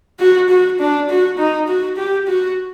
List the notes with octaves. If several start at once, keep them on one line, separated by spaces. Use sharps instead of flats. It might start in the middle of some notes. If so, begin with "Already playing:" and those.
F#4
F#4
D4
F#4
D#4
F#4
G4
F#4